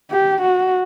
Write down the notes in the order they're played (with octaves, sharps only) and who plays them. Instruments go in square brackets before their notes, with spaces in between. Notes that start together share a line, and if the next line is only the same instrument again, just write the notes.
[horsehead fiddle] G4
F#4